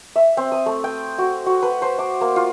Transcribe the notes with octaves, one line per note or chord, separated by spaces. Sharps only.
E5
C4
D#6
A3
G5
F#4
F#4
B4
C5
D6
A#3
F4